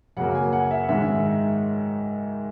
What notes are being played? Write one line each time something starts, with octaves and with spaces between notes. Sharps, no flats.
F#2 C#3 F#3 A#3 F#5
G#5
F#5
E5
G#2 D#3 G#3 E5